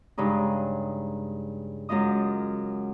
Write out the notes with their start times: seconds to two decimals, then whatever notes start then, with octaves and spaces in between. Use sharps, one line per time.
0.18 G2 C#3 G#3 D#4
1.89 F#2 G#3 F4 D#5 D#6